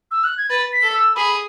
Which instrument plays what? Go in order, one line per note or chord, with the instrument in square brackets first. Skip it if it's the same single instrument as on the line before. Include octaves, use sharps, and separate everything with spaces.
[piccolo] E6
F#6
G#6
[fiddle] B4 [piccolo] A6
[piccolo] B6
[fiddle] A4
[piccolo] E6
[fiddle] G#4 [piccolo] B5